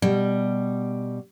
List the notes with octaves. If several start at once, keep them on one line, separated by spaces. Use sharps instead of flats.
B2 G3